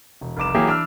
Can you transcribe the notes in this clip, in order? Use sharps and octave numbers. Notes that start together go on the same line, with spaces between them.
E1
F1 C2 D6 E7
E3 F#3 A#3 G4 G#4
E3 D4 D5 E6 F6